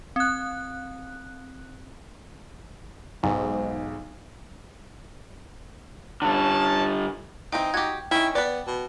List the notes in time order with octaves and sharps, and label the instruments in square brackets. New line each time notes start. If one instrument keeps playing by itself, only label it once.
[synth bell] C4 F#6
[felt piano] B1 [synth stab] G#2
[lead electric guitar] D3 G3 [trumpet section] C#4 A5
[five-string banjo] E3 C4 [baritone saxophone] D#4 [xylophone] G5
[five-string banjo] F#4 G4 [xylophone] G#6
[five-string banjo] D#3 C#4 [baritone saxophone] E4 [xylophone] G5
[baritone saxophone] B3 [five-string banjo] B4 D5 [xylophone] A6
[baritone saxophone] B2